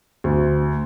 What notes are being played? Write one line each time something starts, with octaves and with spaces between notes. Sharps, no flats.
D2